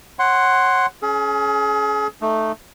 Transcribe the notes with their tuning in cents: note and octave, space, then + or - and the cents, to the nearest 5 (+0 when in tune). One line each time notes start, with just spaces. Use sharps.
C#5 -25 F#5 +10 C6 +0
C#4 +0 G#4 +35
A3 +0 D#4 -15